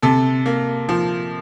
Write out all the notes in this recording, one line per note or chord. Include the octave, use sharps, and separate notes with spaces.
C3 A4
A#3
F3